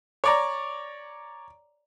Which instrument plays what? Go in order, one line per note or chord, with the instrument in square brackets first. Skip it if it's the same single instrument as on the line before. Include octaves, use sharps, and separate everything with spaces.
[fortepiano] C#5 D5 A#5